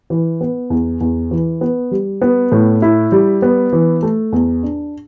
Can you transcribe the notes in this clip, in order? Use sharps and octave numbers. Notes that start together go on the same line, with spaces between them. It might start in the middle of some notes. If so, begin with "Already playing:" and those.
E3
B3
E2
E2
E3
B3
G3
B3
A2
E4
G3
B3
E3
A3
E2
D4